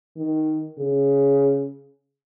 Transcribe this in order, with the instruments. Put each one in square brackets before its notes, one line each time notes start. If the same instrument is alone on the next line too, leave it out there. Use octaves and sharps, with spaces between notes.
[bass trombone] D#3
C#3